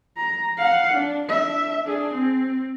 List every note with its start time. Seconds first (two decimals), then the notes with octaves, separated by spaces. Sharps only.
0.17 A#5
0.58 F5 F#5
0.94 D4
1.27 D4 E5
1.83 D4 G#4
2.13 C4